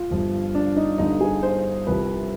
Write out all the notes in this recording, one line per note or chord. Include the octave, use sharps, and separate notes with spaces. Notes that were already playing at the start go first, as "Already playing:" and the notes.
Already playing: F4
G1 G2 F3
D4
D#4
G1 G2 D3 F3 D#4
G#4
C5
C2 C3 F3 B4